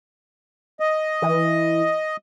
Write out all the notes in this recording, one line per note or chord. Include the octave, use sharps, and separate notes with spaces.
D#5
E3